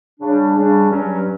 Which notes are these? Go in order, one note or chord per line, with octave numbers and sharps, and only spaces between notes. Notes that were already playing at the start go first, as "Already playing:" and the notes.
C#3 G3 D4
C#3 G3 D4
G2 F#3 C#4